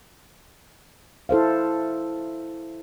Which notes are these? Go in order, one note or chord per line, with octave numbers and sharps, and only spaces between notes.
E4 A4 C5 F5